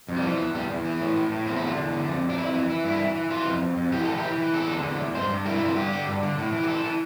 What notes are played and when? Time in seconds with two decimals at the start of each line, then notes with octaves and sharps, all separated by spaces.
0.09 F2
0.16 G3
0.23 E3 F3
0.39 E2
0.55 E2 G3
0.70 E2
0.85 E3
1.01 A2
1.16 A2
1.31 A2
1.46 E2 C4
1.56 E4
1.62 D3 F4
1.77 E2
1.92 D3
2.09 F2
2.23 F2
2.29 D4
2.38 F2 E4
2.54 E3
2.69 E3 E4
2.85 G2 E4
3.00 E3
3.16 E3
3.30 E3 F4
3.46 F2
3.62 F2
3.77 F2
3.92 E3 G4
4.05 E3 A4
4.17 G4
4.24 E3
4.38 E3
4.53 E2 A4
4.69 D3
4.84 E2
5.00 E2
5.15 G2 C5
5.30 G2
5.45 E3 A#4
5.55 E4
5.61 G2 F4
5.76 D3 G4
5.92 D3
6.08 G2
6.23 D3
6.38 A2
6.53 E3
6.63 G4
6.68 E3 A4
6.84 E3